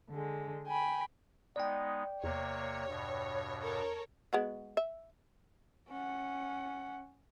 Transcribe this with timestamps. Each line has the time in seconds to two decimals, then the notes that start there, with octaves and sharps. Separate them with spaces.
0.11 D3 G#3
0.66 G5 G#5 B5
1.56 G#3 B3 D#4 D5 G5
2.24 E2 C3 A#3 C#5
2.89 G2 B2
3.61 A4 A#4 C#5
4.33 G#3 B3 F#4
4.77 E5
5.89 C#4 F#5